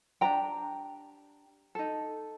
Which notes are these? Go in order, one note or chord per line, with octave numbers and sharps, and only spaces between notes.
D4 G4 A#4 G5 A#5
D#4 A4